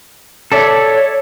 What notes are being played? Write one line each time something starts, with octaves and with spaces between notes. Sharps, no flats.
A4 C#5 D5 E5